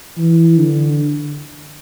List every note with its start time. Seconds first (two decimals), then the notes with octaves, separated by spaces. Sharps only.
0.18 E3
0.58 D3